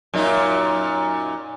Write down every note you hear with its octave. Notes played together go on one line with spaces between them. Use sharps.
F#2 A#2 D#4